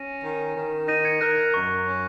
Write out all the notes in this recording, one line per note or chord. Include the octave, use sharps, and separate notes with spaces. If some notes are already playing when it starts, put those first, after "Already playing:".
Already playing: C#4 A#6 D#7
D#3
D#3
D#4 A#6 D#7
G#6 C#7
A#4 F#6 A#6
F#6
F#2 C#6
C#4